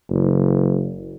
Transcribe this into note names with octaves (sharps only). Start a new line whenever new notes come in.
F#1